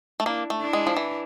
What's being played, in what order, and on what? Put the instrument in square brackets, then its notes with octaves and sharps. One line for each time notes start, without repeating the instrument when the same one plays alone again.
[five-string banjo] A3
[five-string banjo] A#3 [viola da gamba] D4 E4
[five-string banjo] A3
[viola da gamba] D4 E4
[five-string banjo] G#3
F3
E3